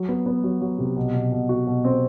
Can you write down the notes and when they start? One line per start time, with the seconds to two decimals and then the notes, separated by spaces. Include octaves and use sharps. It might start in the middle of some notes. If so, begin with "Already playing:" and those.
Already playing: F#3
0.08 B3
0.26 B3
0.44 F#3
0.61 F#3
0.78 C3
0.97 B2
1.14 B2
1.32 B2
1.49 F#4
1.67 B2
1.84 C4